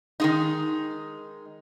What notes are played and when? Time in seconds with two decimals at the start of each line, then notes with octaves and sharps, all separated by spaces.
0.20 D#3 G#3 D#4